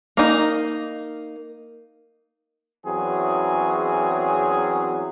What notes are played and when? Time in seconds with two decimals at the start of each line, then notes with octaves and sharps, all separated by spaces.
0.17 A#3 D#4
2.86 E2 E3 F#3 C4 C#4 G#4